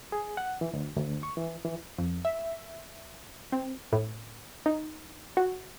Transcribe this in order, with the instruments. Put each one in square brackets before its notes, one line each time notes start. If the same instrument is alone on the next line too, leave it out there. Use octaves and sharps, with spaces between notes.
[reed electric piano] G#4
F#5
E3
D2
D2
C#6
E3
E3
[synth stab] F2
E5
C4
A2
D#4
F#4